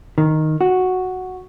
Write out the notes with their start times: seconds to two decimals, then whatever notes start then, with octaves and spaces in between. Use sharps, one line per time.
0.18 D#3
0.61 F#4